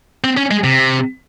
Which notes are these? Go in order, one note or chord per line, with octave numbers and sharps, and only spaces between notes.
C4
C#4
G#3
C3